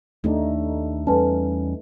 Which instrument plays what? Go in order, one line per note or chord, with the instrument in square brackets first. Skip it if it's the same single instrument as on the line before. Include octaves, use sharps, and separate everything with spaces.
[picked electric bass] D#2 B3 D4 [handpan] A3 D#4
[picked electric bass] E2 G3 C#4 [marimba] A4 B4 A5